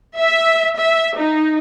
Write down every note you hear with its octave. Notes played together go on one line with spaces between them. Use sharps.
E5
E5
D#4